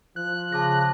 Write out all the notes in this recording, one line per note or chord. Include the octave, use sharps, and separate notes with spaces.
F3 F#6
C#3 A5 D6 A#6